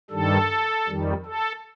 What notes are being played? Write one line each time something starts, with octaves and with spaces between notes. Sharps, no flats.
G2 D#3 G3 A4
F2 D#3 G3
A4